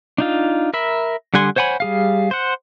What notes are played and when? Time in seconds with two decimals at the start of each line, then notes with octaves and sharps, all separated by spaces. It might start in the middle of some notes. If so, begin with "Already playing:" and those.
0.18 D4 D#4 F4
0.74 A#4 E5 B5
1.34 D3 G3 F#5 G#5 C6
1.56 C5 C#5 F#5 G#5 B5
1.80 G3 G#4 F5
2.31 C5 F#5